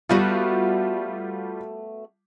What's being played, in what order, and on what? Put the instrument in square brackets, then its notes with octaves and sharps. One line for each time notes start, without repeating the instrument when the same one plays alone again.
[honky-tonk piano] G3 F4 [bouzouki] A3 B3 F#4